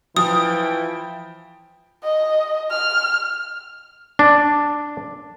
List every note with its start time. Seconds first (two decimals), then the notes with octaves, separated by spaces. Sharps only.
0.16 E3 F3 E4 G5 D#6
2.03 D#5
2.71 F6
4.19 D4